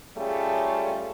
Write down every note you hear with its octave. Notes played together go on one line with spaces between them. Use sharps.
G3 A3 C#4 F4 G#4 A4